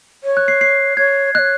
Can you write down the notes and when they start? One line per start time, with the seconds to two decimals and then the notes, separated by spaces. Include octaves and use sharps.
0.24 C#5
0.37 F#6
0.48 C7
0.61 C7
0.97 C#5 G#6
1.34 C#5 D#5 F#6